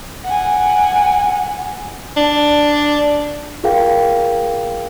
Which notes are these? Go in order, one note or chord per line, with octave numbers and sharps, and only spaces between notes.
F#5 G#5
D4
F4 G#4 A#4 F5 G5